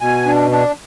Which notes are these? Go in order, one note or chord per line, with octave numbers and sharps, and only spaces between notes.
B2 G#5
D4
D4